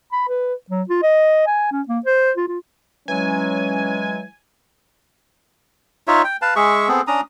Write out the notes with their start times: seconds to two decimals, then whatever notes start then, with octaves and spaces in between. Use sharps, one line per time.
0.12 B5
0.28 B4
0.70 F#3
0.89 F4
1.03 D#5
1.47 G#5
1.72 C#4
1.88 A#3
2.06 C5
2.36 F4
2.48 F4
3.08 E3 F#3 G#3 C#4 G#5
6.08 D#4 F4 C#5 E5
6.24 G5
6.42 B4 F5 A5
6.56 G#3 G#4 E5 C#6
6.88 B3 C4 G#4 A4
7.07 C#4 D4 A#5 D#6